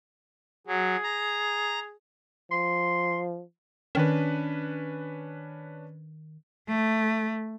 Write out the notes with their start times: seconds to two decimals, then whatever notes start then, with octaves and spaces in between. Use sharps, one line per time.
0.67 F#3 G#4
1.04 A#5
2.51 F3 C6
3.95 D#3 C#4 D4 B4
6.69 A3